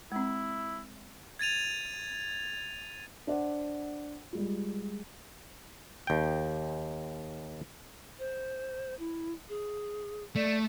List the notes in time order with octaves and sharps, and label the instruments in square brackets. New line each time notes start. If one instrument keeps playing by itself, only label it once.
[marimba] G#3 C4 [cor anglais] E4
[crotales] G#6 A6 D#7 F7
[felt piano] D4 C5 D5 F#5
G3 G#3 F4
[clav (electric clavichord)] D#2 G5
[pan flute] C5
E4
G#4
[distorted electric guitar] A3 [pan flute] D5